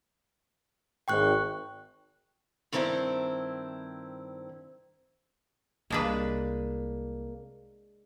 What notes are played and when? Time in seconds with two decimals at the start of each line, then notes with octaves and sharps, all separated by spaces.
1.08 G#1 G5 C#6 F#6
2.72 G2 D#3 C4 E4 G#4 C5
5.90 C2 G#3 A#3 D4 B4